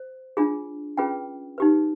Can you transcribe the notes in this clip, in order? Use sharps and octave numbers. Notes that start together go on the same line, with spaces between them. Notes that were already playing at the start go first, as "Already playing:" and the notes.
Already playing: C5
D4 F4 G#4
C#4 F4 G#4 B4 G5
D#4 G4 B4